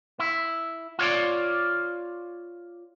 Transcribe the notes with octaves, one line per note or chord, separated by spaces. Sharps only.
E4
F4 C#5 D5